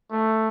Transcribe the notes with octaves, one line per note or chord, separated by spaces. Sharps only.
A3